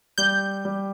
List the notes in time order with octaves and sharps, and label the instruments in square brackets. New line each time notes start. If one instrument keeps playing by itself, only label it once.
[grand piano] G3 [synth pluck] G6
[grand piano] G3